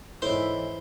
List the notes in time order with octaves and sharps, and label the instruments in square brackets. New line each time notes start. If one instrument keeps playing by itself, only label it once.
[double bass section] G#2 E3 [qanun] E4 D6 [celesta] A4 C#5 D#5 [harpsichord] C5